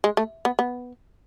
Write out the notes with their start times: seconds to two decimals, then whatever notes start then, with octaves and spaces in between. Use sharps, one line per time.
0.04 G#3
0.17 A3
0.45 B3
0.59 B3